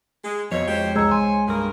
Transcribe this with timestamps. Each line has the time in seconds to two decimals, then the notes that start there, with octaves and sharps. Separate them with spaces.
0.23 G#3
0.52 F2 B2 F3 C#5 D#5
0.68 G#3 G4 C5 C#5
0.95 C2 G#2 G#3 C5 C#5 A#5 E6 G#6
1.11 G#5 C6
1.48 G2 A#3 G#4 A#4